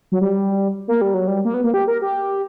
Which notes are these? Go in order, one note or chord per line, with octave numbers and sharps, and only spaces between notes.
F#3
G3
A#3
G3
F#3
G3
A#3
B3
A#3
G4
A#4
G4